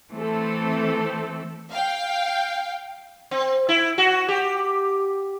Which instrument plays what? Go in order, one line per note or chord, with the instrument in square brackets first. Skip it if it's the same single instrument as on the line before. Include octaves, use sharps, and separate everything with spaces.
[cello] E3 A3 [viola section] C4 A4
[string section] F5 G5
[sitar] C4
E4
F#4
G4